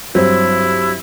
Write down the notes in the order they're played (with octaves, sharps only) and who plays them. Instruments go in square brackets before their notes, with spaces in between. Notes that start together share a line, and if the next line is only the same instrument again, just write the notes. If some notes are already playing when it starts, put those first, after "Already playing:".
[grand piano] G2 F#3 C4 [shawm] E4